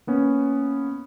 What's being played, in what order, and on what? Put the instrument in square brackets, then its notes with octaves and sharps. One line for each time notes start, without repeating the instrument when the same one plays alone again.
[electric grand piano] A#3 B3 C#4